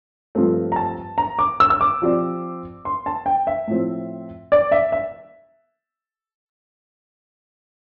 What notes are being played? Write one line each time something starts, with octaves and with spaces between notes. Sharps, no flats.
G2 F3 A3 C4
A#5
A5
A#5
D6
E6
E6
D6
F3 C4 G4 D5
C6
A5
G5
E5
A2 F3 C4
D5
E5
E5